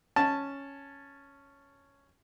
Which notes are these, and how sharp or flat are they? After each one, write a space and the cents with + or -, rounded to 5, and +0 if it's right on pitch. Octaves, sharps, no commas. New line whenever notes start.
C#4 +0 A5 +0